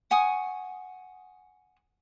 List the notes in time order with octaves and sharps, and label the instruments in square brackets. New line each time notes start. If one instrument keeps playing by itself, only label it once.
[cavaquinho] F#5 G#5 C#6 D#6